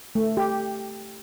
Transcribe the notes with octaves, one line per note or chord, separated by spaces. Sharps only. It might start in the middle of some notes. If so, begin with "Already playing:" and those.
A3
G4